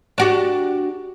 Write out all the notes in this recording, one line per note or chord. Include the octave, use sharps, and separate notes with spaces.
D4 F#4 G4